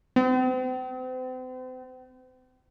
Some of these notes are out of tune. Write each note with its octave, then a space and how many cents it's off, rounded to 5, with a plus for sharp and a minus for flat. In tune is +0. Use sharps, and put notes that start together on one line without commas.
C4 -40